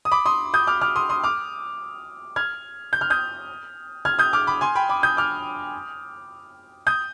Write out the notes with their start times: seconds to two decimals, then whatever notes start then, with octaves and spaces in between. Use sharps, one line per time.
0.05 D#6
0.11 B5 D6
0.26 C6 D#6
0.54 D#6 G6
0.67 D6 F6
0.81 D6 F6
0.96 C6 D#6
1.09 C6 D#6
1.23 D6 F6
2.36 F6 G#6
2.93 G6
3.01 F6
3.10 D#6 G6
4.05 F6 G#6
4.19 D#6 G6
4.33 D6 F6
4.47 B5 D6
4.61 G#5 C6
4.75 G5 B5
4.89 B5 D6
5.03 D#6 G6
5.17 D6 F6
6.87 D#6 G6